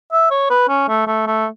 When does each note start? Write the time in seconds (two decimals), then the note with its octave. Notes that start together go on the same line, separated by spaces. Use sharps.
0.12 E5
0.31 C#5
0.50 B4
0.69 C#4
0.88 A3
1.07 A3
1.27 A3